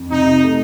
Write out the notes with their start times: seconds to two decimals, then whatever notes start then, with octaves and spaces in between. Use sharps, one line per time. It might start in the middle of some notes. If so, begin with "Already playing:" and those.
Already playing: F2
0.11 C3 D#4
0.44 A3